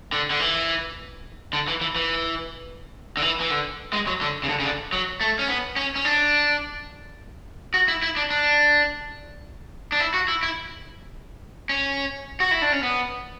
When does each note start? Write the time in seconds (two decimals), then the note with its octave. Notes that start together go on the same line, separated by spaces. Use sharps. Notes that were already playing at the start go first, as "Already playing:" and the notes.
0.12 D3
0.30 D3
0.40 E3
1.53 D3
1.68 E3
1.81 E3
1.96 E3
3.17 D3
3.22 E3
3.40 E3
3.50 D3
3.93 G#3
4.07 F#3
4.21 D3
4.44 C#3
4.49 D3
4.60 C#3
4.64 D3
4.92 F#3
5.21 A3
5.39 C#4
5.48 B3
5.76 C#4
5.96 C#4
6.05 D4
7.74 F#4
7.88 E4
8.02 E4
8.16 D4
8.30 D4
9.92 D4
10.00 E4
10.14 F#4
10.28 E4
10.43 E4
11.69 C#4
12.40 F#4
12.51 E4
12.62 D4
12.72 C#4
12.83 B3